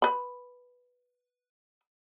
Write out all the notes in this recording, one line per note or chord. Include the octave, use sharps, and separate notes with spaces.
B4 B5